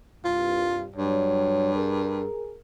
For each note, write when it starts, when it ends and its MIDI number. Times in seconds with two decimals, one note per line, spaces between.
0.25 0.89 36
0.25 0.89 43
0.25 0.85 65
0.96 2.26 43
0.96 1.72 54
0.96 1.72 55
0.96 1.72 73
1.75 2.57 68
1.75 2.57 70